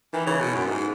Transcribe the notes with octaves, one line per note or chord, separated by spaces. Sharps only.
D#3 E3
C#3
B2
F#2
G#2